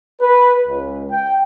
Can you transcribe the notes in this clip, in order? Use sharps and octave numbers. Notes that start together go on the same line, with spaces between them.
B4
C#2
G5